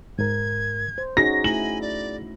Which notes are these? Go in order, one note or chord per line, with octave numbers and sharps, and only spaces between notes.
G#2 A#4 G#6
C5
C#4 D#4 F#4 G#4 A#6
A3 E4 G#5 F#7
D5